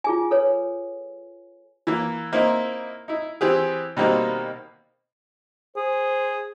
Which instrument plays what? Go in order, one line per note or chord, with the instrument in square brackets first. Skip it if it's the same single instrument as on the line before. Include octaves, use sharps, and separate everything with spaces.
[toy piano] F4 G#4 G#5
A4 B4 C#5 G#5
[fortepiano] E3 A#3
A#3 C4 D#4 E4
D#4 E4
E3 C4 G4 G#4
B2 D#3 G3 A#3 C4 D#4
[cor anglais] G#4 [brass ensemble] C5